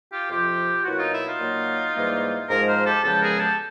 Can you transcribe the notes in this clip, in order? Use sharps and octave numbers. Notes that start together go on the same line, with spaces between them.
F4 G4
F2 C3 F3 F4 G4
B2 F#3 A#3 E4 F#4
D#4 F4
E4
D#4 F4
A#2 F#3 A#3
G#2 E3 G3 A#3
G#2 F3 G#3 G#4 A#4
A#4 C5
G4 A4
E2 C#3 F3 G#3 B3 G4 A4
G#4 A#4
G4 A4